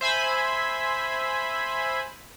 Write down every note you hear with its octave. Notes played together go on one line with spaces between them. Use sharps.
C5 E5 G#5 B5